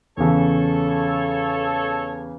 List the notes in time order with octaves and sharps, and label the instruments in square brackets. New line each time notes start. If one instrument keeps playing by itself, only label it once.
[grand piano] E2 C#3 [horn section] A4 C#5 A5